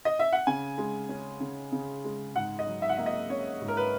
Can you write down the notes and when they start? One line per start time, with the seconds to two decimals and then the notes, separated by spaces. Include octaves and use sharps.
0.05 D#5
0.19 E5
0.33 F#5
0.47 C#3 G#5
0.78 G#3
1.09 C#4
1.40 C#3
1.72 C#3
2.04 G#3
2.35 G#2 F#5
2.59 D#5
2.67 F#3
2.82 E5
2.89 F#5
2.97 A#3 E5
3.06 D#5
3.30 C#4 C#5
3.61 G#2
3.68 A#4
3.77 B4